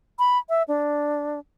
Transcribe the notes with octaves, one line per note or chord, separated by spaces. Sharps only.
B5
E5
D4